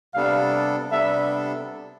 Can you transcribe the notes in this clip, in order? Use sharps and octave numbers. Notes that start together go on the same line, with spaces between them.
C3 G3 B3 D4 A4 F5
C3 G3 B3 D4 A4 E5